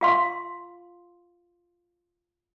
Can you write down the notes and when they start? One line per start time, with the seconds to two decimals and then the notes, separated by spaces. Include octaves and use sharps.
0.01 F4 F5 C6